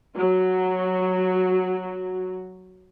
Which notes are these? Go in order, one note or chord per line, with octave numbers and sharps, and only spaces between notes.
F#3 F#4